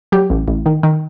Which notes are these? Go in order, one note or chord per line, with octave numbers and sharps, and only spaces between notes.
F#3 G4
A1
A1
D#3
D#3